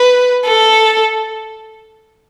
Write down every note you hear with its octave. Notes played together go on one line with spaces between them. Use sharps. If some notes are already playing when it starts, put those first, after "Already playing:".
Already playing: B4
A4